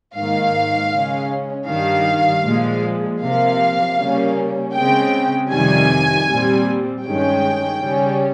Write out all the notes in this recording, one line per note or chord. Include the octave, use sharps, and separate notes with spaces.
G#2 D#3 A#3 F5
C#3 G#3 C#4
G2 D#3 G3 F5
A#2 F3 G#3
C3 F3 A#3 F5
C#3 G3 A#3 C#4
C#3 G#3 C4 G5
F2 C3 D#3 G3 G#5
A#2 G3 C4
G2 D#3 G#3 C#4 G5
C#3 G3 C#4